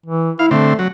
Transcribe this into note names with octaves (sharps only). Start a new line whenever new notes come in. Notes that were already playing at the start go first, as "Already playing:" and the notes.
E3
E4 F5
D3 A3 C4
F#3